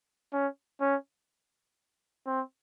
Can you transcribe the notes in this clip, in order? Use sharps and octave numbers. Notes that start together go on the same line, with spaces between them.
C#4
C#4
C4